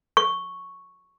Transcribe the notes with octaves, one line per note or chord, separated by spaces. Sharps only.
C#6